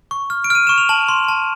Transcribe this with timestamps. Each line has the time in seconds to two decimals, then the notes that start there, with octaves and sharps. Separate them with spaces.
0.11 C#6
0.30 F6
0.44 D7
0.50 F6 D#7
0.67 C#6 E7
0.78 F7
0.89 A5 F#7
1.09 C6
1.28 A5